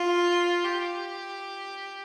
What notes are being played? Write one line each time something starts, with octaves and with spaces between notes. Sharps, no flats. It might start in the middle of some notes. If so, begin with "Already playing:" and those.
Already playing: F4
G4